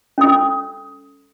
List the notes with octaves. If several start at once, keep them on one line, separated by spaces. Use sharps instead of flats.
C#4 A4 D#6